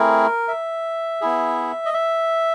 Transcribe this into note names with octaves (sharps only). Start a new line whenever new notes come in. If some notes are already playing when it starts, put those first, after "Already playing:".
Already playing: A3 C4 E4 G#4 A#4
E5
B3 E4 G#4
D#5
E5